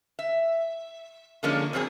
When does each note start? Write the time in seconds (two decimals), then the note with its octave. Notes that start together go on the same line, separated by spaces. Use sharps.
0.19 E5
1.43 D3 F3 G#3 A#3 C#4 D4
1.73 F2 F#3 C4 D4 G#4